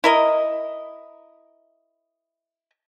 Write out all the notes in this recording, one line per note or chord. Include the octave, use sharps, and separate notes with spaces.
E4 A#4 D#5